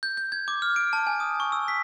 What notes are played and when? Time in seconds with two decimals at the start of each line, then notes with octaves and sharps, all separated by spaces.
0.03 G6
0.17 G6
0.32 G#6
0.48 D6
0.62 F6
0.76 D7
0.93 A5
1.07 G#5
1.20 D#6
1.40 C#6
1.52 E6
1.68 B6